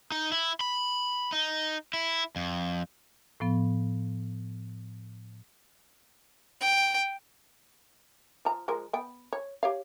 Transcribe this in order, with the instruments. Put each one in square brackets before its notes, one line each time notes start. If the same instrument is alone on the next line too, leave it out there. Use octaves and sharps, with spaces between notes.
[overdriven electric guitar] D#4
E4
B5
D#4
E4
F2
[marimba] A2 F3 B3
[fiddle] G5
[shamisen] F3 A#5
F3 G#3 A#4
B3 G5
C#5
G4 C#5 F5